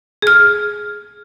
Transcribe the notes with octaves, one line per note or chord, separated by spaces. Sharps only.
G#4 F6